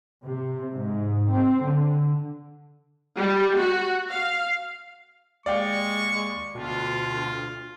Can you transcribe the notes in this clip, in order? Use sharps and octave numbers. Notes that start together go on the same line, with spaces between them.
C3
G#2
C4
D3
G3
F#4
F5
D#2 G#3 D5 F5 G5 C#6
D2 B2 F4